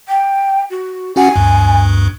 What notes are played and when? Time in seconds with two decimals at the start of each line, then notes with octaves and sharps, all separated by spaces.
0.08 G5
0.70 F#4
1.16 C#4 F#4 F#5 G#5
1.36 D2 G2